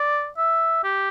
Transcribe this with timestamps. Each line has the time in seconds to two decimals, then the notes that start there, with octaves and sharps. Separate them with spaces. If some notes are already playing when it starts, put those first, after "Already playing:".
Already playing: D5
0.38 E5
0.84 G4